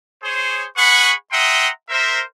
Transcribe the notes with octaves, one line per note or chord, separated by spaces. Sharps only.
G#4 C5 C#5
G#4 B4 F#5 B5 C#6
E5 F#5 G5 A#5 C6 D#6
A#4 C5 E5